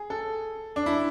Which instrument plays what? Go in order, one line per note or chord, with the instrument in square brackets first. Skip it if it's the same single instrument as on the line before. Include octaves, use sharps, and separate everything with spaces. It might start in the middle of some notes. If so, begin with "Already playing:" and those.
Already playing: [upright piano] G#4
A4
D4
E4